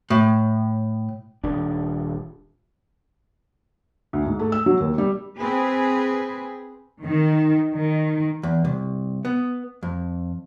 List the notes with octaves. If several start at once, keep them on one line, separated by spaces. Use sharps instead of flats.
A2
D#1 D4
D2
G#2
A3
E6
F#3
D#2
G3
C4 G#4 B4
D#3
D#3
E2
C2
B3
F2